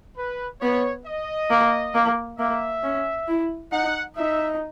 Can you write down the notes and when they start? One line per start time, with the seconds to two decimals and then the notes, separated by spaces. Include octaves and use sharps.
0.17 B4
0.61 B3 C#5
1.06 D#5
1.50 A#3
1.94 A#3
2.39 A#3 E5
2.83 C#4
3.28 E4
3.72 D#4 F#5
4.17 D#4 E5